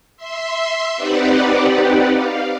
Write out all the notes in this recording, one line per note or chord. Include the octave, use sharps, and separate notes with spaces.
E5 C6
C4 D#4 G4 B4 D5 F#5
F5